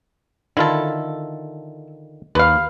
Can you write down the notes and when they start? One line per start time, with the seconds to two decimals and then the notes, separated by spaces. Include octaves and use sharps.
0.57 D3 D#3 E4 F4 A4
2.35 D#2 B4 F5